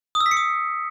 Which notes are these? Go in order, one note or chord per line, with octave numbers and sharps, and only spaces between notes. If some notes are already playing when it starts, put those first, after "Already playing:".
D#6
E6
B6
C#7
D#6